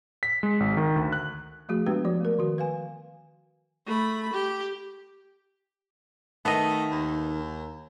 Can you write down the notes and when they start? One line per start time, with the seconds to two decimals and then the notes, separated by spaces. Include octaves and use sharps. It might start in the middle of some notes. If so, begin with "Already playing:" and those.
0.23 B6
0.43 G#3
0.60 G#1
0.77 D#3
0.96 D2
1.13 F#6
1.69 F3 A3 F#4 G#4
1.86 G#3 B3 D4 F#4 G4 B4
2.05 F3 F#4 D5
2.21 A3 A#4
2.39 D#3 F#4
2.58 B4 F5 G#5
3.86 A3 B5
4.33 G4
6.45 D#3 A3 B3 D#5
6.91 D#2